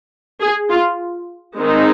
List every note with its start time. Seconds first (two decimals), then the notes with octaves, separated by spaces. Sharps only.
0.41 G#4
0.70 F4
1.57 D#3 G#3 C4 D#4